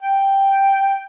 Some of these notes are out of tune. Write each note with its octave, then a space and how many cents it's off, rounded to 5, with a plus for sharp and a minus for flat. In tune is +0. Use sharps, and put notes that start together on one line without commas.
G5 +0